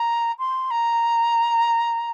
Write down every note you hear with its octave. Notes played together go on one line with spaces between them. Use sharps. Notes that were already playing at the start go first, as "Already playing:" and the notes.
Already playing: A#5
C6
A#5